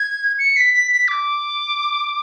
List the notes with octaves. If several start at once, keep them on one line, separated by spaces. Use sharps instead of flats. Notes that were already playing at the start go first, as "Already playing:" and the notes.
Already playing: G#6
C#7
B6
B6
B6
D6